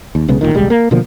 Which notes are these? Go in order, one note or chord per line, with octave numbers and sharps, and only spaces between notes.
D#2
B1 C#3 G#3 B3
G1 C2 A#2 D#3
D#1 C2 G3 G#3
A#3
B2 D3 F3 A#3